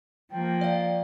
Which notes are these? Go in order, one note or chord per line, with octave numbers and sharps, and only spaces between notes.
F3 A#3 G5
D5 F5